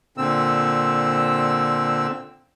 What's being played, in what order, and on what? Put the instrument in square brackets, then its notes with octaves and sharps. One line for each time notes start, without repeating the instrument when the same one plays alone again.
[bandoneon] A#2 D3 C4 E6